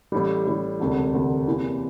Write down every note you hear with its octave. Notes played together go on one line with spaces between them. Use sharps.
A1 A2 G3
A1 A2 G3
E1 D2 C3
E1 D2 C3
E2 C3 E3 A#3